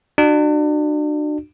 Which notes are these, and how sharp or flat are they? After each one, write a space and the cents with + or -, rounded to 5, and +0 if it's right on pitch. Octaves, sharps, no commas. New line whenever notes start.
D4 +35 F#4 +0